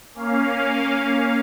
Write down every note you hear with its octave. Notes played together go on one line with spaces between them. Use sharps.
A#3 C#4 F5